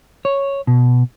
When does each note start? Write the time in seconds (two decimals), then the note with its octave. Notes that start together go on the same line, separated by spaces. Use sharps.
0.25 C#5
0.67 B2